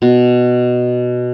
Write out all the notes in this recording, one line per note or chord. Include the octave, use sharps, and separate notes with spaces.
B2